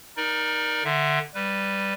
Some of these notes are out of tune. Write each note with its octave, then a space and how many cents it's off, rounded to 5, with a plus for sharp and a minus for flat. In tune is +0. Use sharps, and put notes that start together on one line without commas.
D#4 +0 A#4 +20 D5 +15
D3 +20 E5 +0
G3 +0 B4 +0